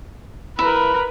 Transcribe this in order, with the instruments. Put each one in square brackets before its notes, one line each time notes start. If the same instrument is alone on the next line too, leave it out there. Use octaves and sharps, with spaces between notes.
[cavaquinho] E4 [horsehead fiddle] A#4 B4